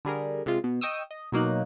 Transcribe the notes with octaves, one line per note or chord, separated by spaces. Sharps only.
D3 G3 G#4 A#4
C3 G#3 F4
B2
D#5 G5 C#6 D#6 E6
D#5
B2 F#3 A#3 D#4 F#6